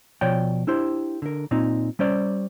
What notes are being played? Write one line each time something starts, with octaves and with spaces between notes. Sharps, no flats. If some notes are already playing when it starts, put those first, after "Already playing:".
B2 F3 C#5 D5 G5
D4 E4 G4 C5
D3 A#4
A#2 C4 D#4
G3 C#4 C5 D5